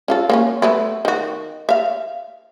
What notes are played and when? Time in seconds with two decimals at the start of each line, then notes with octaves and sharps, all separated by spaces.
0.08 C#4 F4 A4
0.30 A#3 B3 C#4
0.62 A3 B3 E4
1.05 D#3 F#4
1.69 E5 F5